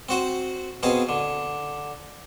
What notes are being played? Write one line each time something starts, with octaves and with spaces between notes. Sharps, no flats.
C4 F#4 C5
B2 C4 G#4 F5
D3